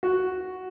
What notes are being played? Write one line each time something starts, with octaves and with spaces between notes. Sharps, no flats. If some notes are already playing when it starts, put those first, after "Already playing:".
F#4